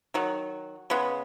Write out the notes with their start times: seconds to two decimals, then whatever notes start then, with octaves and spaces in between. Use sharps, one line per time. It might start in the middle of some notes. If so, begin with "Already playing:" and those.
0.14 D#3 F#3
0.90 C#3 G#3 B3